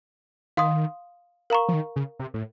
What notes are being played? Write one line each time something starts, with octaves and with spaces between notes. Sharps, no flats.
D#3 F5 C6 D#6
A#4 F5 A#5 C#6
F3
D#3
C#3
C3
A2